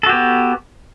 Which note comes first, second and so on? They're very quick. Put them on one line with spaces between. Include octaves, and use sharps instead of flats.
A4 F#4 G4 B3